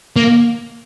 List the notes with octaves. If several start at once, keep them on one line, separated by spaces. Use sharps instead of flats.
A#3